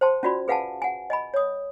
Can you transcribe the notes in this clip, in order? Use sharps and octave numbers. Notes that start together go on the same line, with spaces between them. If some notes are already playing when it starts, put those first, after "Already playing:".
C5 G5 A5 C6
C#4 F4 F#4 D5 B5
G#4 B4 F5 F#5 G#5 A5
F#5 G#5
D#5 G#5 B5
C#5 D#6